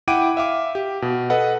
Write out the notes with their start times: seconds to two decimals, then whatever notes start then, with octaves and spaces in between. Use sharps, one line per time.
0.08 E4 F#5 G5 D6 D7 D#7
0.37 E5 F5 D6
0.75 G4
1.02 B2
1.30 A4 B4 D#5 F#5